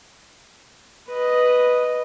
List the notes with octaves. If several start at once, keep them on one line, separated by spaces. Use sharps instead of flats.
B4 D#5